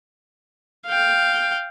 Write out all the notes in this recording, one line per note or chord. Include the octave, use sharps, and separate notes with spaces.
F5 G5